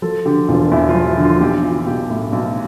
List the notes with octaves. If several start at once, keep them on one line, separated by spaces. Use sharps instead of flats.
F3 A4
D3 G4
E1 F4
E2 E4
F4
F3
E4
D3
F4
B1 G4
E3 F4
B1 G4
A2
B1